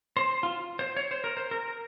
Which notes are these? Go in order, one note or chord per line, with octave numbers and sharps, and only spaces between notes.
C5
F4
C5
C#5
C5
A#4
C5
A#4